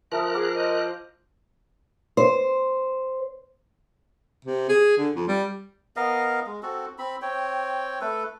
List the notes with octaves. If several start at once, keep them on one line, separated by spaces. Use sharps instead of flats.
F3 A#4 E5 A#5 D#6 F#6
G#4 D6
C5 D#5
C5
C3
G#4
D3
F2
G3
B3 A#4 D#5 F5
G#3
C4 F#4 A4
C4 B5
C4 C#5 G5
A3 A4 B4